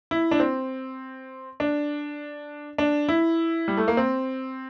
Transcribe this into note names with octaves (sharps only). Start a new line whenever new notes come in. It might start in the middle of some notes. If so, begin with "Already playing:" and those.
E4
D4
C4
D4
D4
E4
G3
A3
A#3
C4